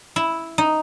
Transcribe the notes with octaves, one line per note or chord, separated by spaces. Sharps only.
E4
D#4